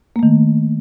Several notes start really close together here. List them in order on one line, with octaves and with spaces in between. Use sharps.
A#3 A3 D#3